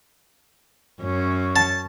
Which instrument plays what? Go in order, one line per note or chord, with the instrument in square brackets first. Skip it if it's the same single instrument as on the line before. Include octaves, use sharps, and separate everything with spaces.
[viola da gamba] F#2 C#4
[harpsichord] A5